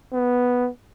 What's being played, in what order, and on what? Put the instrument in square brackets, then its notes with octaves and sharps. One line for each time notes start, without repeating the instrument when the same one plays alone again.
[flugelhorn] B3